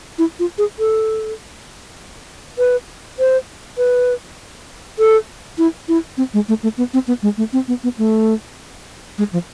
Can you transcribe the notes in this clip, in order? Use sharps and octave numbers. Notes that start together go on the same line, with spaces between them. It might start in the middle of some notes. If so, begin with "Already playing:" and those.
E4
F4
G#4
A4
B4
C5
B4
A4
E4
E4
C4
G#3
A3
A3
B3
C4
B3
G#3
A3
C4
B3
B3
A3
G#3
F3